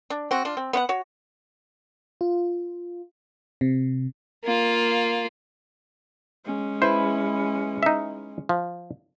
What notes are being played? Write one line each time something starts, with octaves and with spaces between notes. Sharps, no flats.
D4
C4 F#4
D4 F4
C4
B3 F4 F#5
F#4 C#5
F4
C3
A#3 F4
G#3 C#4
E4 B4 C5
D#4 E5
F3